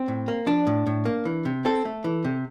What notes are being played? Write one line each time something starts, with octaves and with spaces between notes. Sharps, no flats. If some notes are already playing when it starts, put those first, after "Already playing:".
Already playing: C4
A2
A#3
F3 D4
A2
A2
A#3
E3
C3
C4 A4
A3
E3
C3